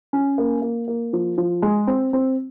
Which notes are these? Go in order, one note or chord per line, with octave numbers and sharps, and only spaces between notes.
C#4
A#3
A#3
A#3
F3
F3
G#3
C4
C4